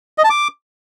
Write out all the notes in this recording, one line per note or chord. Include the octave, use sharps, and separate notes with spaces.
D#5
A5
D6